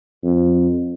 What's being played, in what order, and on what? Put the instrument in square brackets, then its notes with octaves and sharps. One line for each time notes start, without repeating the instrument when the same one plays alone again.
[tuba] F2